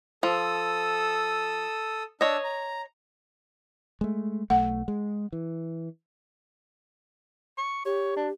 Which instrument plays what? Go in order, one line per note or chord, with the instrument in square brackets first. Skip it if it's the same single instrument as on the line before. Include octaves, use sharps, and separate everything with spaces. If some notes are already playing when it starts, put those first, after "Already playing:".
[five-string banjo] F3 [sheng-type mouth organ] A4 D#6 E6
[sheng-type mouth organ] D4 E6 [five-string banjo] C#5 D#5
[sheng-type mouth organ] A#5
[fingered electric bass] G#3 A3
[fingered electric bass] B1 A3 [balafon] F#5
[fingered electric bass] G#3
E3
[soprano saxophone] C#6
[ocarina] G4 [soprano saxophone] C#5
[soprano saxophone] D4